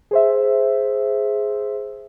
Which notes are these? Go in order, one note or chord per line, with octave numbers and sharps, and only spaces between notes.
G#4 C5 E5